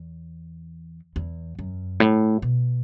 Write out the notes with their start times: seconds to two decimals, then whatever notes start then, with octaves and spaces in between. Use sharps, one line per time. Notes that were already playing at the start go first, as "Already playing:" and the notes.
Already playing: E2
1.16 E2
1.59 F#2
2.00 A2
2.42 B2